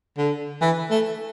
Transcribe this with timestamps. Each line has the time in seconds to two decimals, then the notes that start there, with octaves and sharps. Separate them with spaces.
0.18 D3
0.61 E3
0.91 A3